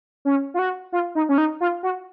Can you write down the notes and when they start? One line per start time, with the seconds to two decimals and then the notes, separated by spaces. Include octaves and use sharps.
0.25 C#4
0.54 F4
0.59 F#4
0.92 F4
1.15 D#4
1.29 C#4
1.38 D#4
1.61 F4
1.83 F#4